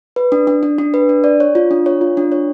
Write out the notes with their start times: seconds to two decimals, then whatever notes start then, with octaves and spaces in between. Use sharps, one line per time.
0.16 B4
0.32 D4
0.47 D4
0.63 D4
0.78 D4
0.94 B4
1.09 D4
1.24 D5
1.40 C#5
1.55 F4
1.71 D4
1.86 C#5
2.01 F4
2.17 D4
2.32 C#5